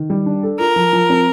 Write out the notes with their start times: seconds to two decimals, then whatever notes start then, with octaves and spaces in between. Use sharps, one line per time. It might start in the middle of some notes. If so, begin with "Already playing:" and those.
Already playing: D#3
0.10 G3
0.26 D4
0.43 A4
0.59 F4 A#4
0.76 F3
0.93 F3
1.10 C4